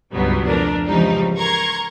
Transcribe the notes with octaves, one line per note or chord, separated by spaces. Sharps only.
C#2 G2 B2 F#3 G3 B3
F2 A3 D4 A#4
G#2 C#3 E3 F3 G3 D#4
A#4 A#5 C6 C#6 G#6